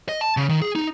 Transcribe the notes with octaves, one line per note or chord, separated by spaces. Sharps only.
D#5
A5
C#3
D#3
G#4
D#4